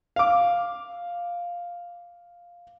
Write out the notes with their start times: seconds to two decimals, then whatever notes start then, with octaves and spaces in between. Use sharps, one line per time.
0.16 F5 D6